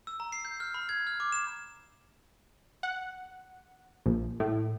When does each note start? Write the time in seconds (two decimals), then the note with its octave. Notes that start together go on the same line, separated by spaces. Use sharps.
0.07 E6
0.20 A#5
0.32 C7
0.45 G6
0.60 F6
0.74 B5
0.89 G#6
1.07 F6
1.20 D6
1.32 E7
2.83 F#5
4.06 A#1
4.40 A2